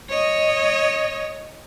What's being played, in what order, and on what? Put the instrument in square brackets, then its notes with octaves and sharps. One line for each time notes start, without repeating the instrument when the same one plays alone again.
[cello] C#5 D#5